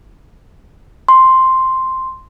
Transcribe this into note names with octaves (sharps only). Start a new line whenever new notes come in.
C6